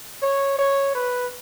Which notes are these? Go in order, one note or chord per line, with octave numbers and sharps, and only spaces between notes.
C#5
C#5
B4